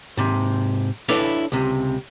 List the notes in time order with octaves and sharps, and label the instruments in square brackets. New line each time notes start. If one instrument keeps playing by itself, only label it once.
[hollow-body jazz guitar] G#2 C3
D4 E4 A4 B4 C#5 D5
C#2 C3